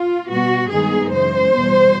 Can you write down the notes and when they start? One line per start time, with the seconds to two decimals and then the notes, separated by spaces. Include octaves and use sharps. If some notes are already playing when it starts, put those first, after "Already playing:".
Already playing: F4
0.28 B2 G3 B3 F#4
0.69 G2 D#3 G#3 B3 D#4 G#4
1.10 F#2 C#3 E3 G#3 C5
1.52 E2 B2 G3 B3